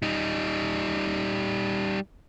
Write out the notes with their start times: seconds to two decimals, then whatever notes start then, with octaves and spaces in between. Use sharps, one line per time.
0.02 G3 D#4